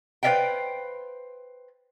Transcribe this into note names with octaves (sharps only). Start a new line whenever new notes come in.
B4 C5 D5 E5 F5 G5